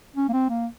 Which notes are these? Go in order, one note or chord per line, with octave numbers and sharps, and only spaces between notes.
C#4
A#3
C4
A#3